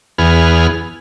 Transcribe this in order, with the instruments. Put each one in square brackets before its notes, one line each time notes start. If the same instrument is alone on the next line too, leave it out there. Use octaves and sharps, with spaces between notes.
[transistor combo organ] E2 B3 G#4 F6